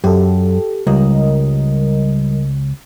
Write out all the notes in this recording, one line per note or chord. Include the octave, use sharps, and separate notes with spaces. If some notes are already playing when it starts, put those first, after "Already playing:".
F#2 G4 A4
C#2 G3 A#4 D#5